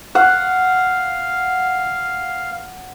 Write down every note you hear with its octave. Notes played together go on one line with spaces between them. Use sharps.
F5 F#5